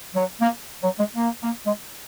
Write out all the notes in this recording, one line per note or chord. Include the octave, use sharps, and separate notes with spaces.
F#3
A#3
F#3
G#3
A#3
A#3
G#3